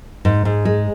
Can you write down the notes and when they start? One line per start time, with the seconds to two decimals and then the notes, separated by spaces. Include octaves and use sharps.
0.25 G#2
0.45 G#2
0.65 G#3